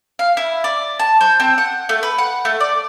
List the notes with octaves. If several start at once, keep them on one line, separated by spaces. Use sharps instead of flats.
F5
E4
D5
A5
C5
C4
F#5
A3
B4
F#5
A3
D5